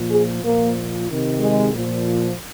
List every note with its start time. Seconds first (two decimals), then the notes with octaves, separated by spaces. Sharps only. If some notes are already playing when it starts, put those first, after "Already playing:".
Already playing: A#2 F3
0.11 G#4
0.44 A#2 F3 A#3
1.08 C3 D#3
1.39 G#3
1.72 A#2 F3